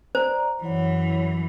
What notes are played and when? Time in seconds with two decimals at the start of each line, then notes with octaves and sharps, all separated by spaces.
0.15 C5 D5 A#5
0.64 F#2 E3 E4 C#5 F#5